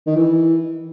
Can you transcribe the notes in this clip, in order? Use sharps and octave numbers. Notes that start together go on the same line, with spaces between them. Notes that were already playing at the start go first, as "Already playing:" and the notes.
D#3
E3